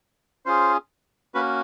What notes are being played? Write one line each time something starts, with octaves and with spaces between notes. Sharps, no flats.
C#4 F4 G#4 C5
A#3 C#4 F#4 B4